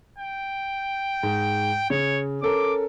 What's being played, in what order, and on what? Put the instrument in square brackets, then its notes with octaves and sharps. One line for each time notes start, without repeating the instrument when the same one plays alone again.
[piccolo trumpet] G5
[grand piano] G#2
[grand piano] C#3 [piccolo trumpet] C#5
[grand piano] C#4 A4 A#4 [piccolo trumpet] D6